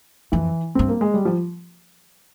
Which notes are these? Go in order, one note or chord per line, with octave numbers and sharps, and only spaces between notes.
F2 E3
G2 C4
A#3
G#3
G3
F3